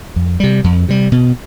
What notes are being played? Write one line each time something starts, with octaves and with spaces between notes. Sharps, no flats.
F2
C3 G3
F2
C3 G3
B2